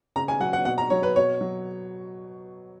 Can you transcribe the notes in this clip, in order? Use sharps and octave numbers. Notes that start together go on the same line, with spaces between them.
C#3 A#5
G#5
F#3 F#5
F#5
B2 F#5
A#5
F#3 C#5
B4
B2 C#5
F#3